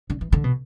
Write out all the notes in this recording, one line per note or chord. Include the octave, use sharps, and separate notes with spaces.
D3
E3
D3
B2